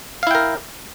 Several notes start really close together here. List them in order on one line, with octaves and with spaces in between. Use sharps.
F5 E4 G5 A#4